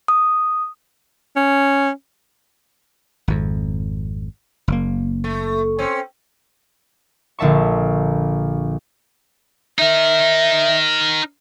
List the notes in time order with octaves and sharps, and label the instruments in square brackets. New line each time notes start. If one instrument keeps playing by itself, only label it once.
[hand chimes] D#6
[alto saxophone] C#4
[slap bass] G#1 F2
F#1 A#3
[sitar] A3
C4 C#4
[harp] A#1 D3 E5 A5 C#6
[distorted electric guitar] D#4 A#4 [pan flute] E5